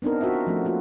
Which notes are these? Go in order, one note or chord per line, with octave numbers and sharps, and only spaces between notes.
B3 C4 D4 D#4 A#4
F4 F#4 A#4 C5 E5
F3 A3 C#4
A#3 F4 F#4